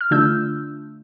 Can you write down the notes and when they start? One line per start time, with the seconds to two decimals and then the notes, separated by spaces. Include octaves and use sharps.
0.01 F6
0.11 D3 A3 D4 F4 E6 G6